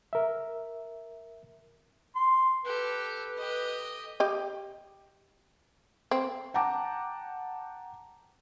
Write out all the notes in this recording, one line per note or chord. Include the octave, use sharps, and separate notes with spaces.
A#4 E5
C6
G4 A4 B4
G4 D#5
G4 D#5
C4
F#5 G5 A5 A#5 D6